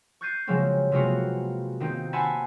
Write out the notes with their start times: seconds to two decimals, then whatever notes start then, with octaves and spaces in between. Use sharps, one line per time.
0.21 C#6 F#6 G6 A6 C7 D#7
0.47 C#3 F3 F#3 G#3 A#3 C4
0.91 C3 G#3 A#3 B3 F4 F#4
1.80 D#3 A#3 C4 D#4
2.13 E5 F#5 G#5 A5 B5 C6